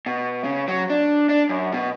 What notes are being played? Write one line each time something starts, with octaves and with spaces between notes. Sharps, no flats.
B2
C#3
F#3
D4
D4
F#2
B2